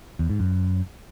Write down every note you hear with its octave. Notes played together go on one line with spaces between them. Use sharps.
E2
G#2
F#2